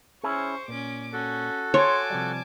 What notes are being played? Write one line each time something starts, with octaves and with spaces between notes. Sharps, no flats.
C#4 E4 G#4 C5 C#6
A#2 C#4 D6
C#4 F#4 A4
C#5 G#5 A5 C6 D6
C3 F3 G3